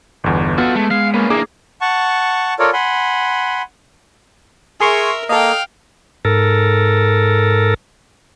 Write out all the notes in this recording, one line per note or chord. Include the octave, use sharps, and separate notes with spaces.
G1 E2
B3 F4 F#4 A4
G#3 A3
G#3 F5
A#3 B3 C#4
A#3 D4 E4 G#4 A#4 D6
F#5 A5 C#6
F4 A4 A#4 C#5 D5
F#5 G#5 B5 C6
G#4 A#4 E5 G#5 C6 C#6
A#3 A4 D#5 F5 G5
G#2 A4 A#4